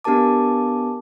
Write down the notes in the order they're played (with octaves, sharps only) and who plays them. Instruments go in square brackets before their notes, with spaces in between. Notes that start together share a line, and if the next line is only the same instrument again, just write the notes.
[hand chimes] B3 D4 G4 A#4 A5 D6